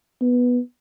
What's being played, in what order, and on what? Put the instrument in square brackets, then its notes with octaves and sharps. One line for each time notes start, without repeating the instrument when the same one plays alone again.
[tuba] B3